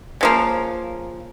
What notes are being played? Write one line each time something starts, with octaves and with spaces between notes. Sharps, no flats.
C#3 F3 A#3